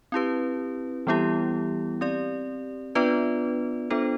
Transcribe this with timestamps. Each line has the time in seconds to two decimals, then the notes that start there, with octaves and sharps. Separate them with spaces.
0.12 C4 E4 G4 B4
1.07 E3 G3 B3 E4 G4
2.01 C4 G4 D5
2.95 B3 D4 F4 B4 D5
3.90 B3 D4 F4 A4 C5